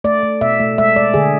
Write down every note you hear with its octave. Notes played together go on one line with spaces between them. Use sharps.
A3 D5
A3
B2 E5
A3
G#3 E5
G#3 D5
D3 G#4